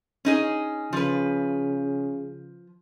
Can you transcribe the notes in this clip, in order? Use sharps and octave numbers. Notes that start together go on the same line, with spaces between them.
C#4 D#4 G#4
C#3 F3 B4